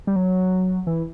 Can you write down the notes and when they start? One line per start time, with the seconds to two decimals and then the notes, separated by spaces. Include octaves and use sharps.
0.07 G3
0.16 F#3
0.87 E3